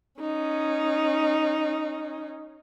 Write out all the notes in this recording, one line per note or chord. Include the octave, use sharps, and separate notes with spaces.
C#4 D#4